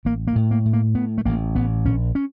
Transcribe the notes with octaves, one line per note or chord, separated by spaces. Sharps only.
A1 A#3
A#3
A2
A#3
A2
A#3
A2 B3
A3
A1 A#3
A1 B3
A#1 C#4
C#4